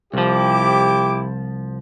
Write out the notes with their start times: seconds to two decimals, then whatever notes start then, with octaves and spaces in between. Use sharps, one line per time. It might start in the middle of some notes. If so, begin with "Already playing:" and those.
0.14 C2 F3 E4 G4 D6